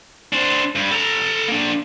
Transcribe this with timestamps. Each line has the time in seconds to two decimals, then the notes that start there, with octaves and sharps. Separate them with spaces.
0.33 D4 C5
0.76 G2
0.92 A4 A#5
1.48 A#3 D4